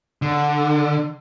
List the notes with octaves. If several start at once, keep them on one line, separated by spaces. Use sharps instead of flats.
D3